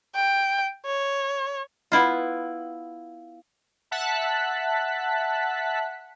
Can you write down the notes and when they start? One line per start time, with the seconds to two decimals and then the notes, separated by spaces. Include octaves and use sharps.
0.15 G5
0.86 C#5
1.92 B3 E4 F4
3.91 E5 F#5 A5 F#6 B6